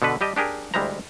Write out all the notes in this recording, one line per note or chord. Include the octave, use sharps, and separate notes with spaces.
B2 D3 A4 B4
G3 G4 D#5 A5
D4 G4 G#4 A#4
D2 G3 G#3 E4 C5 A#5